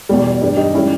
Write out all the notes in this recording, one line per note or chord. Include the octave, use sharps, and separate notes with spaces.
E2 B2 G3
G2 G3
D#4 G4
C#4 E4
G3